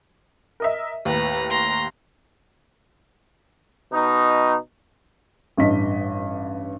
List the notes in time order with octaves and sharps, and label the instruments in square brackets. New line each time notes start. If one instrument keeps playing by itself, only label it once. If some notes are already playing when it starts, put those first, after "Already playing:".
[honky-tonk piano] A#4 D#5 E5
[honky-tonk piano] D#2 A2 [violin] B4 A#5
[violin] A#5 C6
[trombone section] B2 D#4
[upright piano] A1 G2 D#5 B6